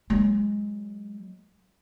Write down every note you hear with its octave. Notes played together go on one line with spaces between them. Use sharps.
F#3 G#3